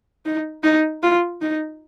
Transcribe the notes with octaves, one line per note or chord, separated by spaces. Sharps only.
D#4
D#4
F4
D#4